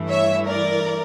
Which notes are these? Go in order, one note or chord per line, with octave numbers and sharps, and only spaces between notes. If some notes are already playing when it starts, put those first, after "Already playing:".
Already playing: G2 E3 A3 E4
C#5 E5
A#4 D5